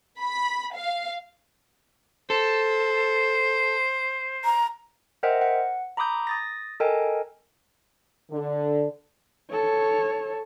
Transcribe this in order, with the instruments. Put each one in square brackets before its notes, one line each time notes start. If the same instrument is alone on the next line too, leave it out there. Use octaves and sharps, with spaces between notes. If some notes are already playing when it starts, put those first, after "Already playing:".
[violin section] B5
F5
[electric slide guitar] A4 [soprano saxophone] C5
[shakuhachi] A#5
[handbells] A#4 C5 D#5 E5 F#5 G5
F#5
A#5 B5 D6 D#6 G6
D#6 A6 A#6
A4 A#4 D#5 G5 G#5
[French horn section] D3
[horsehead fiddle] A4 C#5